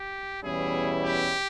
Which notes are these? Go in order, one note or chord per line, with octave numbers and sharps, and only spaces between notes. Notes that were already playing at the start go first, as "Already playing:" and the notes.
Already playing: G4
E2 B2 G3 C#4 E4 G#4
G4